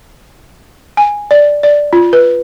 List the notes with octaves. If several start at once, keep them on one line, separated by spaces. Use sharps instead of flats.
G#5
D5
D5
F4
B4